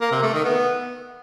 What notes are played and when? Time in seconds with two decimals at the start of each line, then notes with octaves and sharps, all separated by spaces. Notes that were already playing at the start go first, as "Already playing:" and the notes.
0.01 A#3
0.12 C3
0.23 A3
0.34 D#3
0.45 B3